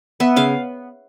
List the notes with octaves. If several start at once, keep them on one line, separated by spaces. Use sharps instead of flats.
B3 E5
C#3 F5